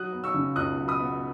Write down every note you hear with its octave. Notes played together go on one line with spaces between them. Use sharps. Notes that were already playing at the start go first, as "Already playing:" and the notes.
Already playing: F#3 D#6 F#6
B3
C#6 E6
C#3
C#2 D#6 F#6
F#3
B5 D#6
B3